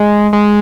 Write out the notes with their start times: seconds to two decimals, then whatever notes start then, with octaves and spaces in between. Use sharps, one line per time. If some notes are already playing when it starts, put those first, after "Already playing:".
Already playing: G#3
0.33 G#3